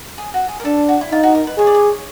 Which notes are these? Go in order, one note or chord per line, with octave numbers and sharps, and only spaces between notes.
G#4
F#4
G#4
A#4
D4 A4
F#4
E4
D#4 F4
F#4
A#4
B4
G#4 C#5
D5
C#5